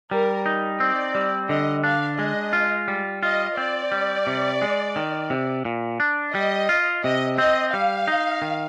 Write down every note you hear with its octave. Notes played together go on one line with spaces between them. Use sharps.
G3 A#4
D#4
C4 D5
G3
D3 D#5
D4 F5
G#3 D#5
F4
G3
F4 D#5
C4 D5
G3
C3
G#3
D#3
C3
A#2
D4
G3 D#5
F4
C3 D#5
C4 D#5
G3 F5
D#4
D#3